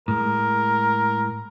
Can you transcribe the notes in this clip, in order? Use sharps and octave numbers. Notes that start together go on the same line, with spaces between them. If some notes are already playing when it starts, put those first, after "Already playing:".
A2 G#3 A#4